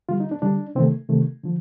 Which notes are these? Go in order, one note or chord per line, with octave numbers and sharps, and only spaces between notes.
D3 G3 F4
D#4
D4
D3 G3 D4
C3 D#3 A3 C4
C3 D#3 A3
D3 F3